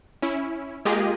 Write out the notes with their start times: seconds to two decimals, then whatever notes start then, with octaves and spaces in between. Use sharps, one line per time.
0.22 C#4 E4
0.85 G#3 A#3 F4 G4 G#4 D#5